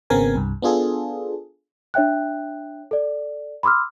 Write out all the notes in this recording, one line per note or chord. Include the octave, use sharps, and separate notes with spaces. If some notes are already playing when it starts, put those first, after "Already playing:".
G#1 C#3 B3 C4 A#4 G#5
C2 G2
B3 D4 F4 G#4 A4
D4 C#5 E5 G5 F#6
A4 D5
B5 C6 D6 E6 F6